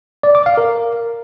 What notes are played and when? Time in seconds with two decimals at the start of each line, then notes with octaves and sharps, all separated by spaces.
0.23 D5
0.35 D6
0.46 F5
0.57 A#4